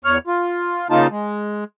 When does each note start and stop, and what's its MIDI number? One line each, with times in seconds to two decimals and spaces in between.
0.05 0.18 40
0.05 0.18 73
0.05 0.18 89
0.27 0.87 65
0.90 1.08 49
0.90 1.08 58
0.90 1.08 63
0.90 1.08 65
0.90 1.08 81
1.11 1.64 56